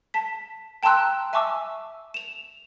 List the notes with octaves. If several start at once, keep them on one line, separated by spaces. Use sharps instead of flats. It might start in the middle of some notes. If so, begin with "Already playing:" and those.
A5 B6
G5 A5 A#5 C6 E6 F#6
E5 G#5 A5 C#6 D6 E6
E7 F7